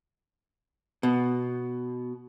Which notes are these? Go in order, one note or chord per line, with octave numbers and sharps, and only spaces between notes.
B2